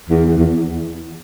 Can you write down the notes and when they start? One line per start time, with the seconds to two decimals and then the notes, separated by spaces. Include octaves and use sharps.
0.09 E2
0.26 E2
0.38 E2